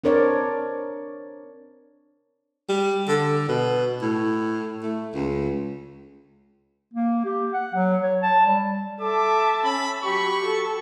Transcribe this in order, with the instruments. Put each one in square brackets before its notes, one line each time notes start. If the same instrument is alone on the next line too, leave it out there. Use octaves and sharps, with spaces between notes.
[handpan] C4 D4 A#4 C#5 D5
[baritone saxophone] G3
D3
B2
A2
A3
C#2
[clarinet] A#3
G4
F#5
F#3
C#5
A5
G3
[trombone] A4 [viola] E5 A5 [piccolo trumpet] D6
[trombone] C#4 [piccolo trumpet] B5
[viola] F#3 B5 [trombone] G4 [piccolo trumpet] C#6
[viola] A4